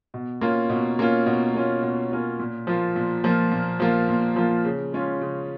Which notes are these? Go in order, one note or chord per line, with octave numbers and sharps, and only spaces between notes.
B2
A#3 C#4 F4
B2
A#3 C#4 F4
B2
A#3 C#4 F4
B2
A#3 C#4 F4
A#2
F3 A#3 F4
A#2
F3 A#3 F4
A#2
F3 A#3 F4
A#2
F3 A#3 F4
C#3
G#3 C#4 F4
C#3